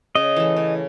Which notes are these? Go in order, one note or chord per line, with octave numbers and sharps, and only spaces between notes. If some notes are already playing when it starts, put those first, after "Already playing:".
C#3 D#5
E3 A3
C#3